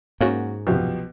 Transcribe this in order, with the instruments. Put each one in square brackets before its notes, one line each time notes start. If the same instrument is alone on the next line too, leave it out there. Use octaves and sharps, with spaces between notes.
[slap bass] G#2 [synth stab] A#3 C#4 F#4
[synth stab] C2 F#2 [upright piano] B2 F3 G4